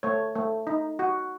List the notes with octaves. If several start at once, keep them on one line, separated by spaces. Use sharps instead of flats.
A3 C#5
A3
D#4
F#4